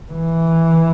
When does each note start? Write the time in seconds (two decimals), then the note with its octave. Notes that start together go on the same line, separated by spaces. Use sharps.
0.12 E3